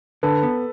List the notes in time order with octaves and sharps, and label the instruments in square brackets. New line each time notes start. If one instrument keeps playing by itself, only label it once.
[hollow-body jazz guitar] D3 [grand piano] A4 B4
[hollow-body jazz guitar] B3